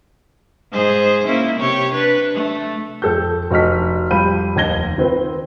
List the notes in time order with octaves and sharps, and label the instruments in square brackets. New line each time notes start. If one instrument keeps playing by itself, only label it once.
[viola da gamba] G#2 G#4 C5
A#3 C#4 E4
C3 G4 C#5
D4 B4
A3
[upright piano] F2 A4 G6
F1 F#4 D#5 F6 B6
F2 G3 F5 B5 G6 D#7
F1 D#2 D#5 G#6 A#6 G7
D#3 C4 F4 B4